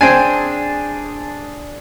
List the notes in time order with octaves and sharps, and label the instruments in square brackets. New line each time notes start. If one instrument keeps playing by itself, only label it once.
[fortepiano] C4 G#5 [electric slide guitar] D4 G#4